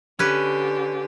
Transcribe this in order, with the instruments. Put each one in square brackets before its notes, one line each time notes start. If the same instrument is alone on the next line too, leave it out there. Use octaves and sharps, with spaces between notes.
[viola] D3 G4 [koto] C#4 B4